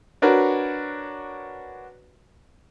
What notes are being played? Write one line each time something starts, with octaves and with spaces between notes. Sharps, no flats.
D4 F#4 A#4 B4 C#5